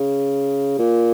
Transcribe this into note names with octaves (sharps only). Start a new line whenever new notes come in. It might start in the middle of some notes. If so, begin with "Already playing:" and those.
Already playing: C#3
A#2